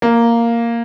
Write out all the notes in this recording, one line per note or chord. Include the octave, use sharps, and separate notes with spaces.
A#3